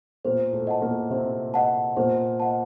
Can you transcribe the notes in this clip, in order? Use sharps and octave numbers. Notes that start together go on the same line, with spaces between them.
A#2 A#3 C5
A2 A3
D#5 F#5 A5
A#2 A#3
C3 C4 C5
D#5 F#5 A5
A#2 A#3 C5
D#5 F#5 A5